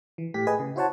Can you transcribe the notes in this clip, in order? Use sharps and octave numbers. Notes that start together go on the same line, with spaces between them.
E3
A2 G4 B6
G#4 B4 D#5 G#5
C#3
E4 F#4 C5 C#5 F#5 A5